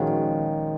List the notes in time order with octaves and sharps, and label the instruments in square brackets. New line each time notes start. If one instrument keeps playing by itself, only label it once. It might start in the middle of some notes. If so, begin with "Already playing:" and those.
Already playing: [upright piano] A#2 F3 G#3 C#4 F#4 [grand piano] D#3